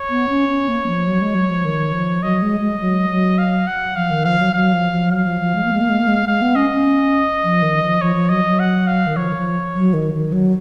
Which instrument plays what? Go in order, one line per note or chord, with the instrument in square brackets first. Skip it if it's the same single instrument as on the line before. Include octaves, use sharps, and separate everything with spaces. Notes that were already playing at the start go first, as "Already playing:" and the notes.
Already playing: [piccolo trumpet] C#5
[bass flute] B3
C#4
C#4
A#3
F3
F#3
G#3
F#3
F3
D#3
F3
[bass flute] F#3 [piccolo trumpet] D#5
[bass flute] G#3
G#3
F#3
F#3
[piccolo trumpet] F5
F#5
[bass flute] F3 [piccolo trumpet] F5
[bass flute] D#3
[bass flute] F3 [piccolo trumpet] F5
[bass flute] F#3
[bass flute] F#3 [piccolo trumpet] F5
[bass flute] F3
F3
[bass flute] F#3 [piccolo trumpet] F5
[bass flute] F3
F3
G#3
A#3
G#3
A#3
G#3
A#3
G#3
[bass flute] G#3 [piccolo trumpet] F5
[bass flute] B3
[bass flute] C#4 [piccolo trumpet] D#5
[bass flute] C#4
F3
D#3
F3
[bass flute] F3 [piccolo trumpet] C#5
[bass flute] F3
[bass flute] F#3 [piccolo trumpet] D#5
[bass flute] F#3
[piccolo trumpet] F#5
F5
[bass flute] D#3
[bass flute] F3 [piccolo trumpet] C#5
[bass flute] D#3
F3
F#3
D#3
D#3
F#3